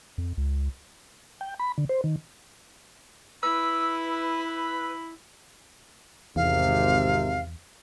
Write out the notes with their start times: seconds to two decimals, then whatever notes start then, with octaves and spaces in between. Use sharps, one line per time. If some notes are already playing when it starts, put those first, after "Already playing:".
0.18 F2
0.37 C#2
1.41 G5
1.59 B5
1.78 D3
1.89 C5
2.04 D#3
3.43 E4 B4 B5 E6
6.36 G#1 E2 C3 F5